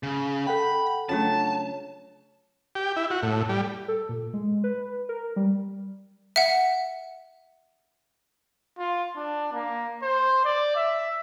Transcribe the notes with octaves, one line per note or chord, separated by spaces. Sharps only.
C#3
A4 F#5 G5 B5
C#3 F#3 A3 D4 F4 A5
G4
E4
F#4
A2
G3
A4
A#2
G#3
B4
A#4
G3
E5 F#5
F4
D4
A#3
C5
D5
E5